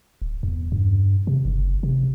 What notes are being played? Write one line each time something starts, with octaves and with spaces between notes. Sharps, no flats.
D1
E2
G2
C3
F#1
C3